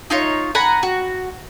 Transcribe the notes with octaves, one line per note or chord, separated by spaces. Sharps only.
D#4 F4 C#5
F#5 G#5 A#5 B5
F#4